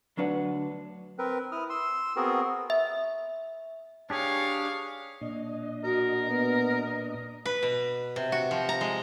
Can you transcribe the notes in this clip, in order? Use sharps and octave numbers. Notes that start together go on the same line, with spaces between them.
D2 F#3 D4 B4 F#5
C4 A#4 B4
E4 D#6 F6
C6 E6
B3 C4 F#4 G#4 A#4
E5
D4 G4 G#4 C#5 F5
A#2 D4 D#5
F#4 A#4
B3
B4
B2
C3
F#4
F3
A#5
G#3